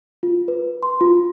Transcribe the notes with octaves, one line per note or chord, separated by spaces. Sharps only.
F4
B4
C6
F4